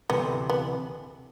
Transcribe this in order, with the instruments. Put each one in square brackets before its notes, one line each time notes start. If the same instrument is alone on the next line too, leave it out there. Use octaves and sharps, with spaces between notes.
[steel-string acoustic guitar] D2 C3 E3 [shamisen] B3
[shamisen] B3